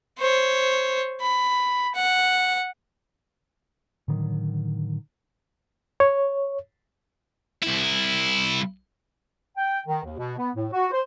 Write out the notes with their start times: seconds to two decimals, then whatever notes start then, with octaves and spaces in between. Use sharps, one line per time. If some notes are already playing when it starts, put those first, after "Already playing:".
0.18 C5 C#5
1.21 B5
1.95 F#5
4.08 A2 D3 D#3 F#3
6.00 C#5
7.62 C2 E4
9.57 G5
9.87 D#3
10.05 D#2
10.18 B2
10.38 B3
10.56 A2
10.73 F#4
10.92 C5